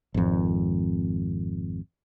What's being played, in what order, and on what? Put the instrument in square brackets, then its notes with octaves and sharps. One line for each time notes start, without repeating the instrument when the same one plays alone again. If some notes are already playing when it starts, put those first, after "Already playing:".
[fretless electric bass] G#1 F2